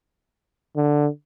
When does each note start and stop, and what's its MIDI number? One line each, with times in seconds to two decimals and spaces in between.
0.76 1.07 50